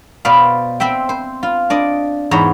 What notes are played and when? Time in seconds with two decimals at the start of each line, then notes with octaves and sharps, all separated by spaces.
0.25 B2 B4 C5 D5 F5
0.80 C4 C5 E5 G5
1.09 C5
1.43 F4
1.70 D4 D5 D#5
2.31 E2 G#2 C5 C#5 A#5